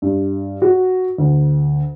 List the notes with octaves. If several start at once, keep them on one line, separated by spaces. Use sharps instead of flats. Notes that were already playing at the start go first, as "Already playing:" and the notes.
G2
F#4
D2